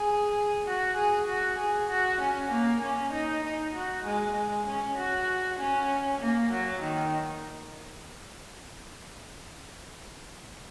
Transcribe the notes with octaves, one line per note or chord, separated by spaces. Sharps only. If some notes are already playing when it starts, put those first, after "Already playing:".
Already playing: G#4
F#4
G#4
F#4
G#4
F#4
C#4
A#3
C#4
D#4
D#4
F#4
G#3
G#3
C#4
F#4
C#4
A#3
F#3
D#3